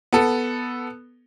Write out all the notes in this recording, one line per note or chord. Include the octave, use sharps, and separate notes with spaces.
B3 A4